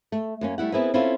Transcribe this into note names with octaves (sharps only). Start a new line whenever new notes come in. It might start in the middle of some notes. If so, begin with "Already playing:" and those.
A3
F#2 A#3 C#4
G3 A3 E4 F#5
B3 C4 E4 G#4 A#4 B4
C4 C#4 E4 F4 A4 B4